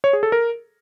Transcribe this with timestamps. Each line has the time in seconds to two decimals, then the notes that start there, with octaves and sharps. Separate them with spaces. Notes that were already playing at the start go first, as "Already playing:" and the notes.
0.04 C#5
0.13 G#4
0.23 A4
0.32 A#4